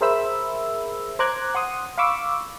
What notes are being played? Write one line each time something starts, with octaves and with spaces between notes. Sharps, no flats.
G#4 A#4 C5 E5 B5 E6
C5 A#5 D6 F#6 G#6
F#5 C6 D#6
F5 B5 C#6 D6 E6